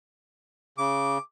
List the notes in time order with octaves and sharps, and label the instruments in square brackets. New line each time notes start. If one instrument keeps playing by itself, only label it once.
[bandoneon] C#3 [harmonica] D6